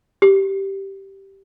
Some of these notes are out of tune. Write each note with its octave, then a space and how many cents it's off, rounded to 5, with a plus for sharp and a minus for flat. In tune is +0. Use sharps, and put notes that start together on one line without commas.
G4 -10